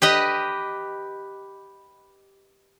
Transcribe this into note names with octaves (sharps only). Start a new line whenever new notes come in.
G4 B4 D#5